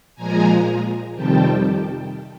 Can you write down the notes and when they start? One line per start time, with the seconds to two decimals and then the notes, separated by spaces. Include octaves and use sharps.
0.15 A#2 F3 G#3 G#5 A#5
1.15 F2 C3 D#3 G3 G5 A5